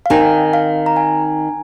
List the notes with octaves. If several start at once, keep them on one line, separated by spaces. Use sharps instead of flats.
F5
D#3 C4 D#4 G#5
F5
A#5
G#5